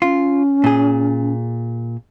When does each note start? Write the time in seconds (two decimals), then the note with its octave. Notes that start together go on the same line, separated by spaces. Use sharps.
0.02 C#4 F4
0.64 A#2 G#4